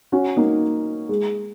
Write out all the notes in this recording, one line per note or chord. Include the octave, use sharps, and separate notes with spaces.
C#4 F#4
A#3 D#4
G#3